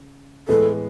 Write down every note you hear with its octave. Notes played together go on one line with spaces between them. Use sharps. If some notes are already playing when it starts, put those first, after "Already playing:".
Already playing: C#3
A2 E3 G#3 B3 A4